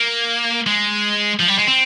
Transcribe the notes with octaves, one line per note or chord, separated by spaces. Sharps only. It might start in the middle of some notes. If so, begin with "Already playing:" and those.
Already playing: A#3
G#3
F3
G3
G#3
C4